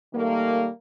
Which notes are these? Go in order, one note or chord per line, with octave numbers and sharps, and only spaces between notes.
D#3 G3 A3 A#3